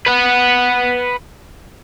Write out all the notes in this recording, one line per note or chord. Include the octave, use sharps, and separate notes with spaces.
B4 F#5